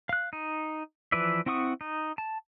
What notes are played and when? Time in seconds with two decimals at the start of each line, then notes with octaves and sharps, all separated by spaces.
0.09 F5 F#6
0.33 D#4
1.12 E3 F3 B4 D5 E5
1.46 C4 E4 F#5 C#6 D#6
1.81 D#4
2.18 A5